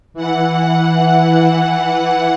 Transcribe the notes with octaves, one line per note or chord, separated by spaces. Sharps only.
E3 F#5